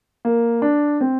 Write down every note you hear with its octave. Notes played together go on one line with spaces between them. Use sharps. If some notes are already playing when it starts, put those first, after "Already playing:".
A#3
D4
C4